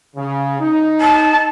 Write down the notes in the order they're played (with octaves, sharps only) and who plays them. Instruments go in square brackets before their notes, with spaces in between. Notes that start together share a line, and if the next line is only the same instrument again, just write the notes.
[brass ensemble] C#3
D#4
[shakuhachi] A5